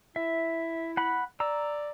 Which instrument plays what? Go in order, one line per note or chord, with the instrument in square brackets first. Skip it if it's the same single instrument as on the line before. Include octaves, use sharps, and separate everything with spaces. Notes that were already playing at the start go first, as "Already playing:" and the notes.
[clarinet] E4 [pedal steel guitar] E5
[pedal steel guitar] F#5 B5
[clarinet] D5 [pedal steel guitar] A#5 E6